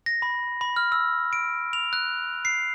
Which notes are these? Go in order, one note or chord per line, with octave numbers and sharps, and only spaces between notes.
A#6
B5
B5
F6
E6
D7
F7
F#6
C7